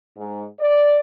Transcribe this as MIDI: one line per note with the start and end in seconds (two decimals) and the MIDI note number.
0.17 0.44 44
0.60 0.99 74